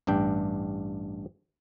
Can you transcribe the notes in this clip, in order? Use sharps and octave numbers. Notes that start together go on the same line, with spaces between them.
A1 G2 D4 G5